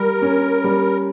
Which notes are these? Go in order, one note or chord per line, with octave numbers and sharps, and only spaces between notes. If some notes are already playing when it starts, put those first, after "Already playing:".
Already playing: G3 A#4
C#4
G3